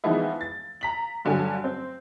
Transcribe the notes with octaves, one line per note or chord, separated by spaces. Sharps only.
E3 F3 G#3 B3 D#4 E4
A6
A#5 B6 F#7
G2 D3 F#3 A4 G#5
C4